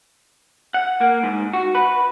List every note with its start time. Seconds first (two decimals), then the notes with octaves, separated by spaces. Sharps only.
0.74 F#5
1.01 A#3
1.23 G#2
1.53 F#4
1.75 B4